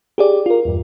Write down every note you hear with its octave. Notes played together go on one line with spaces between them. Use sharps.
G4 G#4 D5
F4 A#4
E2 G2